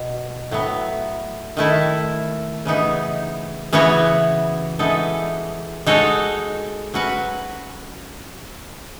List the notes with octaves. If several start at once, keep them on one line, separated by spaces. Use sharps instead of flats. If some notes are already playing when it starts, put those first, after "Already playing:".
Already playing: B2
A2 F#3 B3
D#3 A3 E4
C#3 E3 B3 D#4
C#3 E3 B3 F#4 C#5
E3 G#3 B3 D#4 A4
G#3 D#4 F#4 A4 C#5
F#3 C#4 F#4 B4